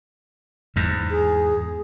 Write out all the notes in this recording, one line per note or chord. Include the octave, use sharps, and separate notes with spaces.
E2 G#2
G#4